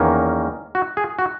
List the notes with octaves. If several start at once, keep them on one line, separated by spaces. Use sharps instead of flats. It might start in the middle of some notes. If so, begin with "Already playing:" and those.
Already playing: E2 D#3 A#3 C#4
F#4
G#4
F#4